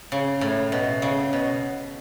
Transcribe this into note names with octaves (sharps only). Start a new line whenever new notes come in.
C#3
A2
B2
C#3
B2